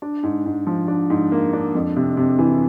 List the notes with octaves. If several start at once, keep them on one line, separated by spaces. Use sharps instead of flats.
D4
G#2
G#2
F3
D4
G#2
A#3
D4
F2
C3
C3
E3